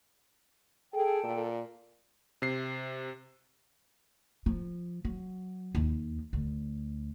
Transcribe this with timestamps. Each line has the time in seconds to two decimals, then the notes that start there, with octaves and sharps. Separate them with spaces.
0.94 G#4 A4 G5
1.24 A#2
2.42 C3 C7
4.46 F3
5.05 F#3
5.75 D#2
6.33 D2